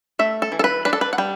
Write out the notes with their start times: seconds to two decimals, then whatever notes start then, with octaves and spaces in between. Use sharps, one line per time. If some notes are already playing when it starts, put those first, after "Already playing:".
0.19 A3 E5
0.42 A4
0.52 E3
0.59 A4
0.64 B4
0.85 D4 B4
0.93 A4
1.01 B4
1.13 F#5
1.18 G3 G5